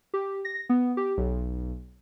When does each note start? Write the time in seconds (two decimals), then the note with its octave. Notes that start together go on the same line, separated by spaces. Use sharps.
0.14 G4
0.45 A#6
0.69 B3
0.97 G4
1.17 B1